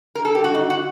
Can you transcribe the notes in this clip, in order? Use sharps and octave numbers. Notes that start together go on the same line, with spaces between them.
A#4
A4
G4
G2 F#4
D3 D#4
F#4